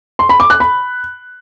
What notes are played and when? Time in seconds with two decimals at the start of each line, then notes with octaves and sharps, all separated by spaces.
0.19 C6
0.29 B5
0.40 D6
0.50 F#6
0.60 B5